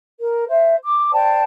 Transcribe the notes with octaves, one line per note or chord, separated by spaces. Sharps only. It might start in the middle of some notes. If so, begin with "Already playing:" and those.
A#4
C5 E5
D6
C5 D5 G5 A5